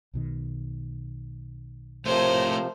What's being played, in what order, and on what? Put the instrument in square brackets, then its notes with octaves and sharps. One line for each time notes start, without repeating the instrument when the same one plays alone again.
[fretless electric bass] B1 B2 D#3
[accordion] C3 F3 [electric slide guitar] A3 C#5 [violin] A#4 C5